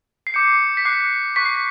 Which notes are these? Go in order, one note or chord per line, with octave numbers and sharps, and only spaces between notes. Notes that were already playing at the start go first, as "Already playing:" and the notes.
C7
D6 G6 C#7
B6
D6 F#6 C7
C#6 F#6 B6
C7
B6